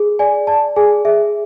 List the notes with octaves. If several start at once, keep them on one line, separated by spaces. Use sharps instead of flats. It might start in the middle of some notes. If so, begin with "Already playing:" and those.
Already playing: G#4
D5 G#5
D5 A5
G#4 G#5
G#4 E5